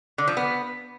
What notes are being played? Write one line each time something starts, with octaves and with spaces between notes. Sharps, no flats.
D3
F3
B3